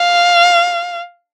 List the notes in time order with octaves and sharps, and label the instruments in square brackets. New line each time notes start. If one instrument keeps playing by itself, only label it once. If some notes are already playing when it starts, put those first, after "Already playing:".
Already playing: [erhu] F5